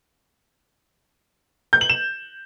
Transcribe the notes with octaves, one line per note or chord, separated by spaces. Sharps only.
G6
F#7
E7